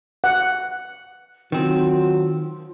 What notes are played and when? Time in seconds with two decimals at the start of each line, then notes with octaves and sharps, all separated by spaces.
0.24 F#5
1.52 D#3 F#3 C4 F4